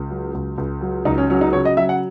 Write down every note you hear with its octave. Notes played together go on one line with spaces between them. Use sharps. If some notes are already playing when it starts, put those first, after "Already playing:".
Already playing: C#2
F#3
C#2
C#2
F#3
C#2 D#4
C#4
F#3 C#4
D#4
C#3 C#5
D#5
F#3 E5
F#5